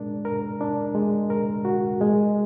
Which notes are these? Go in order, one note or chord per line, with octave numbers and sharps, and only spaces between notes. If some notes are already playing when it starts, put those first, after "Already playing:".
Already playing: G#3 D4 A#4
A#4
D4
G#3
A#4
F#4
G#3